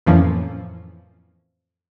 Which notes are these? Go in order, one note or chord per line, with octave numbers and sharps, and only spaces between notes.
F2 A2 E3 F3 A#3 C#4